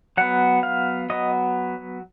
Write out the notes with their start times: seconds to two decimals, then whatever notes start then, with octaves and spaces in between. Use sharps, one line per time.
0.17 F#3 B3 F#5
0.63 F5
1.10 F#3 B3 D#5